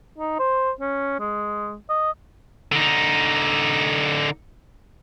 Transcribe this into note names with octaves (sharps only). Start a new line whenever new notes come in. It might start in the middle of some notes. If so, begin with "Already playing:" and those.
D#4
C5
C#4
G#3
D#5
D3 D#4